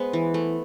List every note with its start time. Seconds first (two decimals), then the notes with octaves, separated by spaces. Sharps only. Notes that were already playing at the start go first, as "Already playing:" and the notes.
Already playing: G#3 B3 C5
0.13 E3
0.34 A3